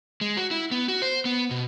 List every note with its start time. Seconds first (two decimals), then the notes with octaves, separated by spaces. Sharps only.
0.21 G#3
0.37 F#4
0.51 E4
0.71 B3
0.88 F#4
1.02 C5
1.25 B3
1.51 B2